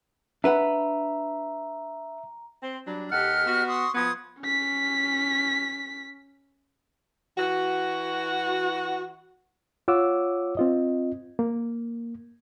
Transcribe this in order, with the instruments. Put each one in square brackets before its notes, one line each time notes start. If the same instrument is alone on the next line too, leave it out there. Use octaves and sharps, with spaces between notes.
[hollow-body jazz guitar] D4 B4 F#5 [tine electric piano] E5 [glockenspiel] A#5
[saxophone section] C4
F#3 G3 D4
[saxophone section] D#2 A4 F#5 [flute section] G4 D#5 F6
[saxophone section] B3 F#4
[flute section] C6 C#6 D#6
[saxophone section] F3 B3 [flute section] C6 D#6 G#6
[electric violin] C#4 B6
[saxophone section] E3 F#4
[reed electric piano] F4 C#5 F#5 D6 E6
C4 F4 D#5
A#3